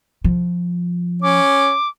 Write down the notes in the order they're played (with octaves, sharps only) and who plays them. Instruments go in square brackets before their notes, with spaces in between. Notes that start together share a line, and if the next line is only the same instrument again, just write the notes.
[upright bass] F3
[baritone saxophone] C#4 [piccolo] D6